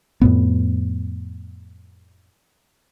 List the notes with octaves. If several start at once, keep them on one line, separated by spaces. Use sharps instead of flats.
F2 A2 B3